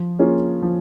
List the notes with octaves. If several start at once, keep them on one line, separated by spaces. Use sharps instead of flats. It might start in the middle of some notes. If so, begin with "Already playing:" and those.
Already playing: F3
A#3 C#4 F4 G#4
F3